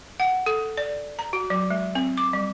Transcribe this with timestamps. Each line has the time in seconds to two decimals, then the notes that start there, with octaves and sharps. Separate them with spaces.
0.20 F#5
0.46 A4
0.77 D5
1.19 A#5
1.33 F#4
1.50 F#3
1.71 G#3
1.95 C4
2.18 D6
2.33 G3